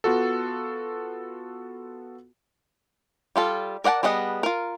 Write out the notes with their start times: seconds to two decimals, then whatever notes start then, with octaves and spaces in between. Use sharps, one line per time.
0.04 B3 F4 F#4 A4
3.36 G3 F4 A4
3.84 A#4 D5 F#5 G5 A5
4.03 G3 B3 G#4 D#5 F#5
4.43 F4 A#4